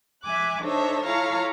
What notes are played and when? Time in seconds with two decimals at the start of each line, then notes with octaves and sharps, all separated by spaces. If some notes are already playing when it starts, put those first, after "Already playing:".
0.23 E5 G#5 D6 F#6
0.62 D4 D#4 A4 C5 C#5 E5
1.06 E4 F4 A4 C#5 F5 A#5